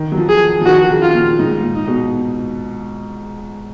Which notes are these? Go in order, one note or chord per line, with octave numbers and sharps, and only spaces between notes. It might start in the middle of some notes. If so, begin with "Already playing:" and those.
Already playing: D#3
F#3
F3
G#4
F3
D#3 F#4
C#3
F4
A#2
G#2 D#4
A#2
D#4
B2